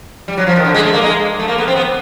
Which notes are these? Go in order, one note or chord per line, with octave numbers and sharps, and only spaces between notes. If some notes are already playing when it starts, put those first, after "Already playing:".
G3
F#3
F3
D#3
D3
G#3
A3
A#3
G#3
A3
A#3
B3
C4
B3